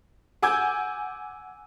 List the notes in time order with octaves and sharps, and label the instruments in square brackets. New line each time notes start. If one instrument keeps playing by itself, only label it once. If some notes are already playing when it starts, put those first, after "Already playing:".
[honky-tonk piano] F#5 G#5 D6 E6 G6 G#6